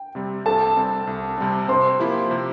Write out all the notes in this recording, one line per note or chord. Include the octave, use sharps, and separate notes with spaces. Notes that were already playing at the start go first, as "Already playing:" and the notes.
Already playing: G5
C3 G3 C4
C2 A4 A5
C3 G3 C4
C2
C3 G3 C4
C3 C5 C6
F3 A#3 E4 G4
C3